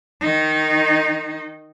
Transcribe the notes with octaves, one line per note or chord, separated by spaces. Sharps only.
D#3 D#4